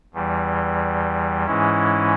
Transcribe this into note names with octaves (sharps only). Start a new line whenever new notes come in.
E2 E3 G3
G#2 E3 G#3 C#4 E4